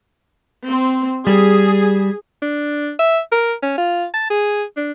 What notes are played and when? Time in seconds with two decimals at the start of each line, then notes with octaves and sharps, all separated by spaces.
0.66 C4
1.27 G3 G#4
2.42 D4
2.99 E5
3.31 A#4
3.62 C#4
3.78 F4
4.14 A5
4.30 G#4
4.77 D4